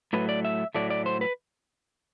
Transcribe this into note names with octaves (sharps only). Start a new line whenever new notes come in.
A2 F#3 A3 B4
D5
E5
A2 F#3 A3 D5
D5
C5
B4